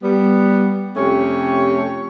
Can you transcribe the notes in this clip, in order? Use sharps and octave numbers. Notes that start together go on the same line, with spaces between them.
G3 B3
F2 C3 A3 C#4 G4 C#5